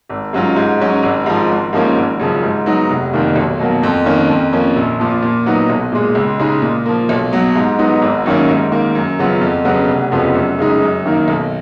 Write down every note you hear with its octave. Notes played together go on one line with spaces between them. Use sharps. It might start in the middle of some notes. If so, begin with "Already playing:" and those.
G#1
G#2 F#3 C#4 F4
G#2
F#3 C#4
G#1
G#2 F3
G#1
G#2 F3 A#3 C#4
G#1
F#2 C#3 F3
G#2
F#3 B3 D#4
F1
F2 D#3 A#3
B1
B2 F#3 A#3
F2
D#3 A#3 C#4
F2
F3 A#3 C#4
A#1
A#2 F3
A#2
F#3 B3 D#4
B1
A#2 G#3
C#2
C#3 G#3 D#4
A#2
F3 A#3
B1
B2 F#3
G#2
F#3 B3 D#4
G#1
F#2 D#3 A#3 C#4
G#2
D#3 A#3
F#2
C#3 F#3 B3 F4
F2
C#3 F#3 B3
F1
F2 C#3 F3 B3
F#2
C#3 G#3 D#4
F#2
D#3 A#3 D#4
B1